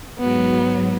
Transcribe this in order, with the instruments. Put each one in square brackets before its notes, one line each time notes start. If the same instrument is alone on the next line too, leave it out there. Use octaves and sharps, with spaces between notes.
[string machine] G#2 F#3 [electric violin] B3